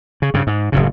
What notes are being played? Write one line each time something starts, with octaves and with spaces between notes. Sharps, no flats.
C#3
G2 C#3
G#2
F#1 A2 C#3